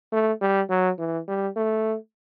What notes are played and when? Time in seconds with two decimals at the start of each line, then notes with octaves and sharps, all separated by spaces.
0.13 A3
0.41 G3
0.70 F#3
0.99 E3
1.28 G3
1.57 A3